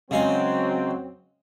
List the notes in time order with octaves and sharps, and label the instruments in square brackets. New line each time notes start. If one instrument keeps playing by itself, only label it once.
[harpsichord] C#3 G#3 F5 [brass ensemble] F#3 C4